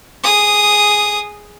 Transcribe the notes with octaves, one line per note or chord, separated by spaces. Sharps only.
G#4 D#6